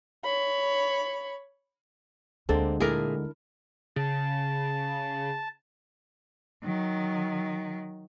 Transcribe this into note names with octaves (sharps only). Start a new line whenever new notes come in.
C#5 B5
D2 D3 G#3 A#3 C4 A4
A#2 A3 D4 E4 G#4 A#4
C#3 A5
D#3 F#3